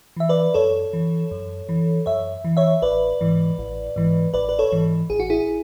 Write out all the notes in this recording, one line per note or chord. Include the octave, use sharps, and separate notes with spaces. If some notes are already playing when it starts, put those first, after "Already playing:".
E3 E5
B4 D5
F#2 A4 C#5
E3
F#2
E3
F#2 C#5 E5
E3
C#5 E5
A1 B4 D5
G#2 E3
A1
G#2 E3
A1 B4 D5
B4
A4 C#5
G#2 E3
A1 G#4
F#4
E4 G#4